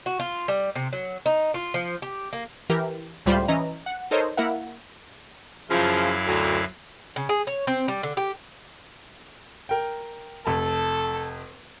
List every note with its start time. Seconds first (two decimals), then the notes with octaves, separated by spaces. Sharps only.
0.06 F#4
0.20 F4
0.48 G3
0.75 C3
0.93 F#3
1.26 D#4
1.54 F4
1.74 F3
2.02 G4
2.33 A#3
2.70 E3 G4 A#4
3.26 C#2 A2 G3 F4 C5 B5
3.48 E3 C#4 D#5 A#5
3.86 F#5
4.11 D#4 A4 A#4 C5 C#5 D#5
4.37 A#3 E4 A#4 E5 F#5
5.70 F#2 C#3 F3 E4 F5
6.27 D2
7.16 C#3
7.29 G#4
7.47 C#5
7.67 C4
7.88 G3
8.03 D3
8.17 G4
9.69 A#4 G5
10.46 F1 A4 A5